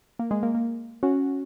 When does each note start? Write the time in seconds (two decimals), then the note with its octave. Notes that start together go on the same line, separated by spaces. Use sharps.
0.19 A#3
0.31 G#3
0.43 A#3
0.55 A#3
1.03 C#4 F#4